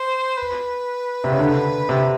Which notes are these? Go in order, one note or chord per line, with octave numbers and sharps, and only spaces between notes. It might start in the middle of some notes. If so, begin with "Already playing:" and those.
Already playing: C5
B4
C3
C#3
D3
C3